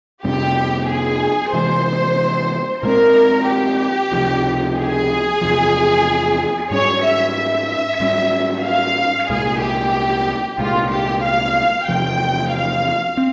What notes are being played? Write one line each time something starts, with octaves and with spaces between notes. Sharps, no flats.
F2 C3 G3 C4 G4
G#4
C3 E3 G#3 C5
A#2 G#3 C4 A#4
G4
C#2 C3 F3 C4
G#4
E2 C3 F3
G#2 G3 C#4 C#5
E5
E5
G#2 G3 A#3 C#4
F5
C2 A#2 G#3 G#4
G4
C2 A#2 G#3 F4
G4
F5
E2 C3 F3 G5
F5
C4